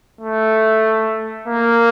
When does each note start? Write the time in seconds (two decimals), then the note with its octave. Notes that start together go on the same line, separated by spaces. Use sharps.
0.21 A3
1.48 A#3